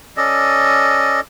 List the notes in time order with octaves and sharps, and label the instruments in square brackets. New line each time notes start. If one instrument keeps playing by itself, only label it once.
[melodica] C#4 A4 D5 D#5